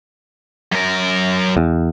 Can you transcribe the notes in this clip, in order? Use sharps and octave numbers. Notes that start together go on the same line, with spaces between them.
F#2 A#4
E2